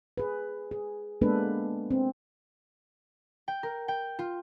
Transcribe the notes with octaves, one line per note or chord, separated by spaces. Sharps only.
G#4 B4
G#4
G#3 A#3 B3 D4 A4 B4
C4
G5
A#4
G5
F4